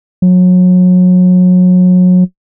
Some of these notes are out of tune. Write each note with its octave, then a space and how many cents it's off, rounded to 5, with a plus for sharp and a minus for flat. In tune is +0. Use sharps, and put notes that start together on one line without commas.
F#3 -30